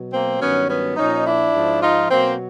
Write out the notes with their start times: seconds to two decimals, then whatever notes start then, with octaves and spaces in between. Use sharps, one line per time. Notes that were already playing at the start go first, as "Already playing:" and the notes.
Already playing: B2 F#3
0.13 A#3 C4
0.41 G2 D#3 F#3 B3 C#4
0.69 B3 C#4
0.97 A#2 F3 C#4 D#4
1.25 D4 E4
1.53 G#2 F3
1.82 D#4 F4
2.10 B2 F#3 A#3 C4